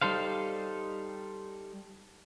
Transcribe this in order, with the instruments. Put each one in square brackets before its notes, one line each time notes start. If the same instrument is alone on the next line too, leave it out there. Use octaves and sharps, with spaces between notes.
[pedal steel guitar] G3 D#4 A4 C5 F5